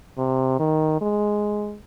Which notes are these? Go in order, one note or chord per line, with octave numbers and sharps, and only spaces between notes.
C3
D#3
G#3